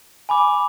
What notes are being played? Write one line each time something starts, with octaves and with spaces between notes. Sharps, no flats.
G#5 B5 D6